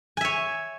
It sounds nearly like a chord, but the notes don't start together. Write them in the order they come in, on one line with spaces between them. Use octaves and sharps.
G#5 E5 C#5